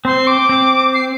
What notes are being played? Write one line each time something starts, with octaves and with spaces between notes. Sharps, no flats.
C4 C6
D6
C4
C7